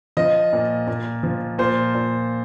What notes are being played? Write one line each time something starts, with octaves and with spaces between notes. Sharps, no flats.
F3 D#5
A#2
A#2
F3
A#2 C5
A#2